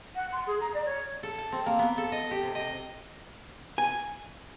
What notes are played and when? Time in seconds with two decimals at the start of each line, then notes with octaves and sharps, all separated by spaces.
0.15 F#5
0.32 C6
0.47 G#4
0.61 A#5
0.74 D5
0.85 C#5
1.23 A4
1.38 A5
1.52 C4
1.66 A#3
1.79 B3
1.98 A4
2.12 D#5
2.31 G4
2.43 C3
2.55 D#5
3.78 G#5